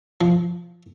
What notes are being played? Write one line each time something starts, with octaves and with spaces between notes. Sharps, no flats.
F3